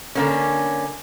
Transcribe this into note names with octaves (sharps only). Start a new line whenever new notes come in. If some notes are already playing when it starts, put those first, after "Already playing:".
D3 A#3 C#4